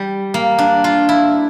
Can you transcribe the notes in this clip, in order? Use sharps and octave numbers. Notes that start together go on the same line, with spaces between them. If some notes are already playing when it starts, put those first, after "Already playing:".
Already playing: G3
A#3
D4
F4
E4